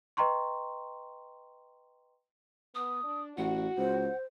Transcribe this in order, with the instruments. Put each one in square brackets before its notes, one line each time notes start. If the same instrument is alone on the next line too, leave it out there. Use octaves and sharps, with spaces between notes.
[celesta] B4 D#5 G5 A#5 C6 C#6
[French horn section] B3 [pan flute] D#6
[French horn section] D4
[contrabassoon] A1 [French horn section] F#4 [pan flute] F#5
[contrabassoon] C#2 [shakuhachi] C5